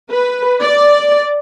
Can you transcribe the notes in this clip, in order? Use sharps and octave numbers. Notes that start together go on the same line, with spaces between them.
B4
D5